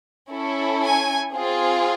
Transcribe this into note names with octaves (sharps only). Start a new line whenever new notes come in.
C#4 E4 A4
G#5
C4 F4 G#4